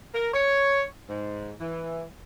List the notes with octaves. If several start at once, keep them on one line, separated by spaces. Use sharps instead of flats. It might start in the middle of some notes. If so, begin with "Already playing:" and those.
A#4
C#5
G#2
E3